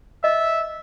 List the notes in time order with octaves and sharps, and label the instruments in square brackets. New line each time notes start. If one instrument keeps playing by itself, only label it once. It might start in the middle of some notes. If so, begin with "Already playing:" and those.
[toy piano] D#5 [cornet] E5